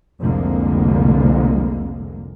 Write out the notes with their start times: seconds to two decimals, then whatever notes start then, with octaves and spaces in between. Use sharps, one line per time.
0.20 F1 C2 F2 D3 G#3 A#3